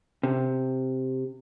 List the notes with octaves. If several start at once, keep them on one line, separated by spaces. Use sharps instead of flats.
C3